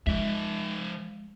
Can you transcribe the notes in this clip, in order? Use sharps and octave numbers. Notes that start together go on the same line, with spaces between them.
F3 G#3 E5